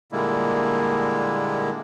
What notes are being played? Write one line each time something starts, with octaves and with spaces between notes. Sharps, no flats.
A#2 D3 G3 G#3 A#3 E4